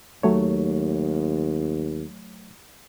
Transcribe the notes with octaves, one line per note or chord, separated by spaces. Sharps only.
D#2 F#3 A3 C#5